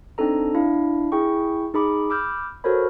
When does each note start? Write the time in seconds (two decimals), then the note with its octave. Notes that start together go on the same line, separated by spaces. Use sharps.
0.18 C4 D4 D#4 A4 A#5
0.54 D4 E4 F5
1.12 E4 G#4 G5 C#6
1.74 D#4 G#4 B5 D6
2.10 B5 D6 E6 F6 G6
2.64 F#4 A4 A#4 C5 C#5 B5